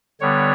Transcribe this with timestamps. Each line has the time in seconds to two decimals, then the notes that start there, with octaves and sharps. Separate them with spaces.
0.20 D3 G3 B3 C#5